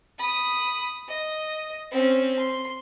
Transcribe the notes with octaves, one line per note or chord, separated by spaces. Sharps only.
B5 D#6
D#5
C4 C#4
C6